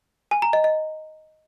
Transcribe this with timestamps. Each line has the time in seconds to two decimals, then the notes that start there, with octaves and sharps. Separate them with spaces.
0.31 G#5
0.42 A#5
0.53 D#5
0.64 D#5